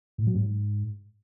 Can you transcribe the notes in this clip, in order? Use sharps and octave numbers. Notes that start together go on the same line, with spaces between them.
A2
F#3
G#2